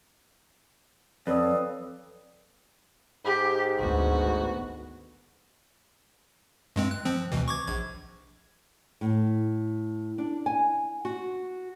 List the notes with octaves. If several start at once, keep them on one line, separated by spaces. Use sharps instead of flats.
F2 A4 B4 C#5 D5 D#6 E6
G#2 G4
G#1 D2 B3 F#4
G2 G#3 C4
F#6
F3 C4
D2 B2 E3
C#6 D6 G#6
A#1 G#6
A2
D4
G#5
F#4